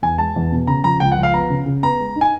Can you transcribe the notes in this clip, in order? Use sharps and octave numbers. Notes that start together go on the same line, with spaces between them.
E2 G#5
G#3 A5
E2
B2
C#3 A#5
F3 A#5
C#2 G5
F#5
F3
F5
B3 A#5
C#3
C#3
B3 A#5
G#3
D#4
G#5